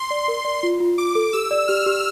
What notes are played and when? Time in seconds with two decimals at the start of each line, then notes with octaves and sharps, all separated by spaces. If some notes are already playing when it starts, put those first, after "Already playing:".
Already playing: C6
0.11 D5
0.28 A#4
0.45 D5
0.63 F4
0.80 F4
0.98 F4 D6
1.15 A4
1.33 G4 E6
1.51 D5
1.68 G4 F6
1.86 G4